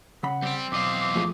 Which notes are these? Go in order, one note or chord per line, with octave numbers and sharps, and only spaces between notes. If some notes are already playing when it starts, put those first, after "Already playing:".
C#3 F#5 B5
G3 C4 G5
B1 E2 D#5 F5 D6
D6
F3 A3 G#4